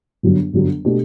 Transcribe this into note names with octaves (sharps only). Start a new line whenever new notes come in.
G1 F#2 D3 F#3
G1 F#2 D3 F#3
B2 A3 D4 G4